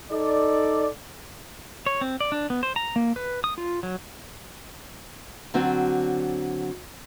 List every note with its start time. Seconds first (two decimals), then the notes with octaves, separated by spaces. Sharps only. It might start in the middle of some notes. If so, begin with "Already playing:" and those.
0.11 D#4 A4 D5
1.86 C#5
2.01 C4
2.21 D5
2.32 D4
2.50 B3
2.63 C5
2.76 A#5
2.96 A#3
3.16 B4
3.44 D#6
3.58 F4
3.83 F#3
5.54 D3 F#3 C4 F#4